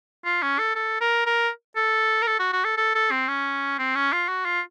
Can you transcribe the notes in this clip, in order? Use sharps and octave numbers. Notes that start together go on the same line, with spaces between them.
F4
C#4
A4
A4
A#4
A#4
A4
A#4
A4
F#4
F#4
A4
A4
A4
C4
C#4
C4
C#4
F4
F#4
F4